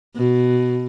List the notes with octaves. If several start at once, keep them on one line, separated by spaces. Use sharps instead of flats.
B2